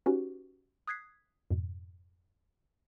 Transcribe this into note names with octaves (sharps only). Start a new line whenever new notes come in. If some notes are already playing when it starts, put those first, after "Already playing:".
C#4 D#4 F#4 G4 B4
D#6 F#6 G#6 B6 C7
F2 G#2 B2